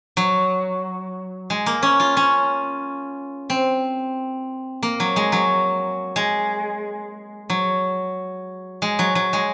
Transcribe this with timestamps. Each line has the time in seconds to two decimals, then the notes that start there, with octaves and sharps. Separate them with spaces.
0.17 F#3
1.50 G#3
1.66 A#3
1.83 C#4
2.00 F4
2.17 C#4
3.50 C4
4.83 A#3
5.00 F#3
5.16 G#3
5.32 F#3
6.16 G#3
7.50 F#3
8.82 G#3
8.99 F#3
9.15 F#3
9.33 G#3